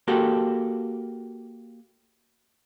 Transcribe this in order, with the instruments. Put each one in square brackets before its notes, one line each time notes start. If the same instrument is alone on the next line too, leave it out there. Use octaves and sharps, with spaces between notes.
[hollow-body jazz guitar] A#3 F#4 G4 A4